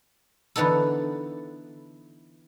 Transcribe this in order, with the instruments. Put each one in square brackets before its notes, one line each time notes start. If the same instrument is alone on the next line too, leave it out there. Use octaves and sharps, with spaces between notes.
[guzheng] D3 E3 B3 D#4 A4